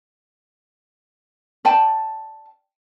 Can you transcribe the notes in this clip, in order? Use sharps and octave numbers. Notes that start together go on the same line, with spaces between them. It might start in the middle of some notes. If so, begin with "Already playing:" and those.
D5 G5 A5